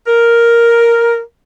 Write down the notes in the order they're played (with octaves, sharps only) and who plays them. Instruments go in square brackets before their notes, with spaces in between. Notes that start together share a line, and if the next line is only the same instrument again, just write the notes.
[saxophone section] A#4